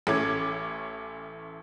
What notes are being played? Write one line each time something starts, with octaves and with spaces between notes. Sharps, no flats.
A1 A3 C#4 E4 D6 G#6